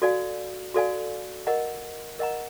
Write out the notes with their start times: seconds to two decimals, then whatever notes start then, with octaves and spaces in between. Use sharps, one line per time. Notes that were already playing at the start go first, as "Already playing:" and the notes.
0.02 F#4 A4 D5 F5 G#5
0.74 F#4 A4 D5 F5 G#5
1.47 A#4 D#5 F#5 A#5
2.19 A#4 D#5 F#5 A#5